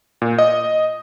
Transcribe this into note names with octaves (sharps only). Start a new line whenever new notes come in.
A#2
D#5